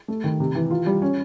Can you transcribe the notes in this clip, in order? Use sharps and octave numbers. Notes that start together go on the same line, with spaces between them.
A3
D#3
C3
E3
F4
G3
C#4